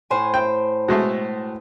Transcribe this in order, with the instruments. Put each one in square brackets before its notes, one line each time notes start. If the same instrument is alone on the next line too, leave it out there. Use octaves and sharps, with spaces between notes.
[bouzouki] A2 C5 G#5
[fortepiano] G5
B2 G#3 A3